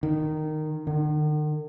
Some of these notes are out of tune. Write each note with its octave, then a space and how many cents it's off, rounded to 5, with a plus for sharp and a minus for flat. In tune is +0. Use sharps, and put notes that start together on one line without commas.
D#3 -10
D#3 -45